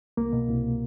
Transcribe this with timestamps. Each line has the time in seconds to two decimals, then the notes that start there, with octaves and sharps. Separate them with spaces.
0.17 C2 A#3
0.33 B2
0.49 C2